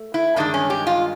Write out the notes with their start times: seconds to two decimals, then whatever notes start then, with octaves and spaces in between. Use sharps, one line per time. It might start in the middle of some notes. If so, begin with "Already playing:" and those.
Already playing: A3
0.14 E4
0.36 G2 D#3 G#3 D4
0.54 C#4
0.70 G4
0.87 F4